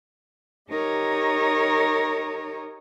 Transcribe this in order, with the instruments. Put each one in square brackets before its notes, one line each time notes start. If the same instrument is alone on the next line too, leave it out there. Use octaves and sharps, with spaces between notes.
[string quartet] D#4 G4 A#4 C#5